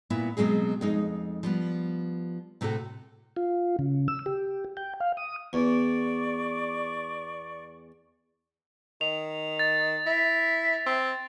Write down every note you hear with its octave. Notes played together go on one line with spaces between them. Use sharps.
A#2 B3 E4 E5
B2 F#3 G#3 C4 G#4
F2 G#3 D#4
F3 G3 B3
A2 C3 A3 F#4 A4
F4
C#3
E6
G4
G5
F5
D#6
E2 D5 C#6
D#3 F7
A6
E4
C4